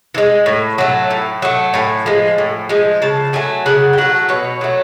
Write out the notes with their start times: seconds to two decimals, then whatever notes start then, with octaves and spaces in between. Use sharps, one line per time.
0.14 E3
0.18 G#3
0.46 A2
0.78 F#3 A3
1.11 A2
1.42 F#3 A3
1.74 A2 G#5
2.06 F3 G#3
2.38 A2
2.69 F3 G#3
3.02 C#3 A5
3.33 F#3 A3 G#5
3.66 C#3 F#5
3.93 G5
3.98 F#3 A3 F#5
4.29 B2 C#5
4.61 F#3 A3